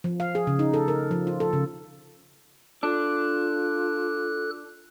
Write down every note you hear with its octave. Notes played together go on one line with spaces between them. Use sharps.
F3
F5
G#4
C#3
D#4
A4
A#4
F3
F4
A4
C#3
D4 F4 A4 F#6